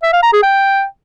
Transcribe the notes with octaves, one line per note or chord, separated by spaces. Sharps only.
E5
F5
A#5
G#4
G5